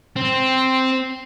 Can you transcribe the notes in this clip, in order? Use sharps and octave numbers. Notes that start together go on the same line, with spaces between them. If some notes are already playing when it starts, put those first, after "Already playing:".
C4